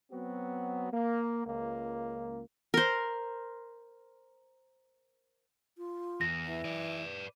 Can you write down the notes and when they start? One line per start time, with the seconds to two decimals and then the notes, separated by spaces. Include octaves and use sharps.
0.12 F#3 B3 C4 F#4
0.93 A#3
1.47 C#2 A#3
2.74 A#4 C5
5.78 F4
6.21 E2 A#6
6.45 E3
6.65 B4 D5